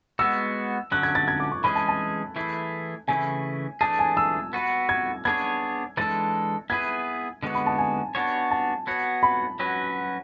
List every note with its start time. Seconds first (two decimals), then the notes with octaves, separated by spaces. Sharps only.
0.19 G#3 B3 F#4 E6
0.92 D3 F#3 C#4 F#6
1.03 G#6
1.15 A6
1.28 G#6
1.40 D6
1.52 C#6
1.64 E3 G#3 C#4 G#4 B5
1.76 A5
1.89 A5
2.36 E3 A3 E4 G#4
3.08 C#3 E3 A3 E4 G#5
3.81 E3 A3 D4 G#4 A5
3.99 G#5
4.17 E6
4.53 B3 F#4 B4
4.89 G#6
5.25 B3 D4 G#4 C#5 G#6
5.97 E3 G#3 D4 A4 A6
6.70 B3 E4 G#4 B4 G#6
7.43 D3 G#3 B3 F#4
7.55 B5
7.66 A5
7.78 G#5
8.15 B3 D4 F#4 C#5
8.51 A5
8.87 B3 F#4 C#5
9.23 B5
9.59 F#3 C#4 F#4 B4